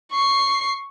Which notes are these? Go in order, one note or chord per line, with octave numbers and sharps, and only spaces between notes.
C#6 C7